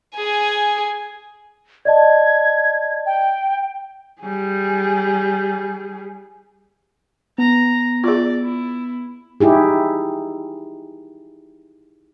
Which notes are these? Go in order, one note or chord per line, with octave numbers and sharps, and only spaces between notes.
G#4 G#5
D5 D#5 A5 G#6
G5
G3 G#4
B3 A#5
F4 G#4 D5
E4
D#4 E4 G4 G#4